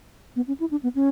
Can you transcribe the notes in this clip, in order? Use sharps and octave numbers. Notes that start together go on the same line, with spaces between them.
B3
C#4
E4
D4
B3
C#4